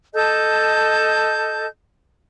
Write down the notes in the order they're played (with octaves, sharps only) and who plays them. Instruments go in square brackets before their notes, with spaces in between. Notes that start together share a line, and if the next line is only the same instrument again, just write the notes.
[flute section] A4 D#5 A5 G6